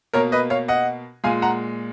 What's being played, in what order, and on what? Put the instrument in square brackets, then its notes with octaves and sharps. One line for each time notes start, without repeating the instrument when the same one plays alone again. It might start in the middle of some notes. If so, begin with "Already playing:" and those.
[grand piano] B2 A#3 A#4 C#5
B4 D#5
C#5 F5
D#5 F#5
A#2 G#3 F5 G#5
F#5 A#5